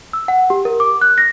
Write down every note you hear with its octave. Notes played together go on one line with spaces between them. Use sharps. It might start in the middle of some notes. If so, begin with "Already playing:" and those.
E6
F#5
G4
A#4
D6
F#6
A#6